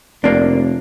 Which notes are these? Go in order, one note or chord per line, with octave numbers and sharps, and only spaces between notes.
F1 A#3 D4